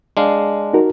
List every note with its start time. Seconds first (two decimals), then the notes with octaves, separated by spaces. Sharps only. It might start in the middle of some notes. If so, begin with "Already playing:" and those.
0.17 G#3 D4 F5
0.73 D#4 F#4 A#4